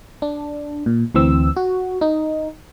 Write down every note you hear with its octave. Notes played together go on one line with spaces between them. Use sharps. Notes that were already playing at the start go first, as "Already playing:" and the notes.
D4
A#2
D2 E3 C4 E6
F#4
D#4